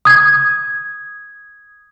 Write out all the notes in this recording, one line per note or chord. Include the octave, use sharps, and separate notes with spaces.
D#6 G#6